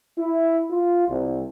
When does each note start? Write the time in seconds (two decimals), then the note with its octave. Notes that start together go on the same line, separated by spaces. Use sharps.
0.18 E4
0.71 F4
1.09 C2